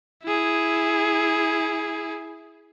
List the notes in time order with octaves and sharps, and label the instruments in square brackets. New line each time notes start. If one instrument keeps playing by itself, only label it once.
[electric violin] E4 G#4